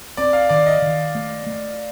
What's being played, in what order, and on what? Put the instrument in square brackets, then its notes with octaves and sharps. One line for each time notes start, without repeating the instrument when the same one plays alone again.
[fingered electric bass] C4 [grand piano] D5
[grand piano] F5
[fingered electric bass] D#3 [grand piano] D5
[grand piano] D#5
[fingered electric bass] D#3
A3
A3